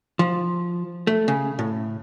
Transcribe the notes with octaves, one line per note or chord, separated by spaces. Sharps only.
F3
A3
C#3
A2